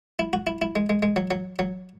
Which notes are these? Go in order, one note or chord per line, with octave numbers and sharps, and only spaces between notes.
E4
F#4
E4
E4
G#3
G#3
G#3
F#3
F#3
F#3